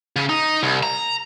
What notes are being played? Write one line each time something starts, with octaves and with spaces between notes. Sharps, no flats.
C#3
D#4
C2
A#5